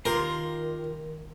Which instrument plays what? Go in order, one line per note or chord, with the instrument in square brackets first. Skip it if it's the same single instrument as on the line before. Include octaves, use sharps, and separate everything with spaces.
[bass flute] D#3 [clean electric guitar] F4 G4 C6 [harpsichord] A#4